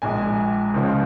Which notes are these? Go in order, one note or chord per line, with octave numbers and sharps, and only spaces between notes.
A#1 A#2 G#3 G#5
C#2 C#3 F3 G#3 F4